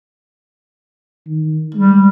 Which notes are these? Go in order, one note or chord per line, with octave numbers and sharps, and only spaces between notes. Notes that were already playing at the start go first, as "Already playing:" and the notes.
D#3
G3 G#3